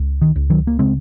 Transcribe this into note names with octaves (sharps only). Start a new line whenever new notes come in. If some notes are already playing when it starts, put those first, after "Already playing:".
Already playing: C#2
D#3
C#2
D#3 F#3
A#3
C#3 G#3 C4